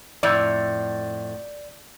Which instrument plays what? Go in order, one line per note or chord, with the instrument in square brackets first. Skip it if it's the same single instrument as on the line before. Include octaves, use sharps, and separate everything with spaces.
[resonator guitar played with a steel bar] F2 A2 [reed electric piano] D5 G6